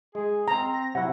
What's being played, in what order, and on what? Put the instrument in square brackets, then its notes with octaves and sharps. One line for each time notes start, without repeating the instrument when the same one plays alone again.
[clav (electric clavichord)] G#3 [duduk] G#4
[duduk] C4 [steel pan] A#5
[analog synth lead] A#6
[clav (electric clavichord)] C3 E4 [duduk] F#3 [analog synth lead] F#5